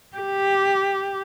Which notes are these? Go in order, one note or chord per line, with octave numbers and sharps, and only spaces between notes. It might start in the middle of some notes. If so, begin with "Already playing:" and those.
G4